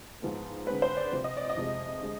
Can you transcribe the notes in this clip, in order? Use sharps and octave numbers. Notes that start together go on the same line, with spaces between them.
G#2 F3 G#3 B3
D3 G#3 C4 B4
C5
D5
C3 F3 C4
D#5
D5
D#5
F2 C3 F3 G#3
D3 G#3